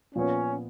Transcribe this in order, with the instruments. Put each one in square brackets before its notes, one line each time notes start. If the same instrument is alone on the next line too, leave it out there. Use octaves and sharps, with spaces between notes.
[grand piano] A#2 F3 B3 F4 [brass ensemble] C#4